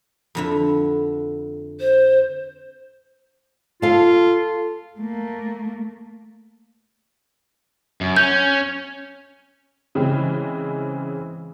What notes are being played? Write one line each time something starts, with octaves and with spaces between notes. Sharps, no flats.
F2 D3 E4
C5
F4 A4 F5
A3 A#3
F#2
C#4 G6
C#3 E3 G#3 C4